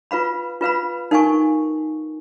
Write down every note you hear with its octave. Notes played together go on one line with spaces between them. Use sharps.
F4 B4 F5 B5
F4 B4 F5 B5
D#4 A#4 F5 G#5 C#6